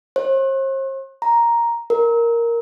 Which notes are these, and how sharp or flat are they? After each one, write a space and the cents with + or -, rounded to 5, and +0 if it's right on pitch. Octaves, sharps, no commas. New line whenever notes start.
C5 +45
A#5 +5
A#4 +0